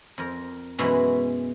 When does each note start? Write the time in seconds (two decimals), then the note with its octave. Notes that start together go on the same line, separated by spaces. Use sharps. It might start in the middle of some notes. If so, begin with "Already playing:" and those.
0.18 F2 A#4
0.78 F#2 B2 E3 G#3 B4